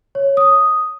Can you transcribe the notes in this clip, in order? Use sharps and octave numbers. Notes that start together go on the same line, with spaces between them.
C#5
D#6